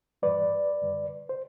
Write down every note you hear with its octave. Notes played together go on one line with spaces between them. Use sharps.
G2 E3 G3 B4 D5
F#2 D3 G3
C5